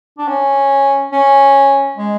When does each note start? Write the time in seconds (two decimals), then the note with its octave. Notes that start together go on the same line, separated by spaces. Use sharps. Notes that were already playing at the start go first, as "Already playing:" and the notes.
0.18 D4
0.28 C#4
1.12 C#4
1.97 G#3